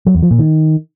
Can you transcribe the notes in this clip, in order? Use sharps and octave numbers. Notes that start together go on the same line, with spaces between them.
F#3
E2
F3
A#2
D#3